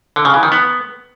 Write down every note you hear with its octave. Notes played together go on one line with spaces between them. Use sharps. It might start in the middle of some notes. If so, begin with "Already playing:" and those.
D3
C#3
E3
D#3
B3